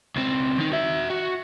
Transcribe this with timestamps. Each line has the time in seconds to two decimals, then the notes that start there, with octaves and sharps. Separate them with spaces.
0.16 C#2 C4
0.58 D#3 D#4
0.72 F#4 E5
1.10 F#4